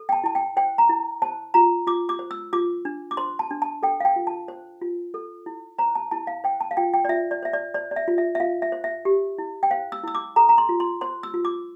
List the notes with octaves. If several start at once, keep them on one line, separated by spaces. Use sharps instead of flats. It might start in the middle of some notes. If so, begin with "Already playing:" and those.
Already playing: A4
G5
A5
E4 A5
G5
C5 G5
A#5
E4
C5 A5
F4 A#5
F4 D6
D6
C5
E6
F4 D6
D4
D6
C5 C6
A5
D4
A5
A4 G5
F5
G5
F4
A5
C5
F4
A4
E4
C5 A#5
A5
E4 A5
F5
C5 G5
A5
F5
F4 G5
G5
D5
F4 E5
D5
C5 E5
D5
C5 D5
D5
E5
F4
E5
E5
F4 F5
E5
C5
E5
G4
E4
G5
C5 F5
E6
E4 E6
D6
A4 A#5
A#5
C6
F4
C6
C5 C6
E6
F4
D6